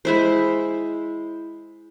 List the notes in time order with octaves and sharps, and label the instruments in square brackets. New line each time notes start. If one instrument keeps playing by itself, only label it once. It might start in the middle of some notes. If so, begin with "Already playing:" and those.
[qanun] G#3 E4 C5